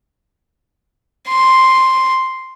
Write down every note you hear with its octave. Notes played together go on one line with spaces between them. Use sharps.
C6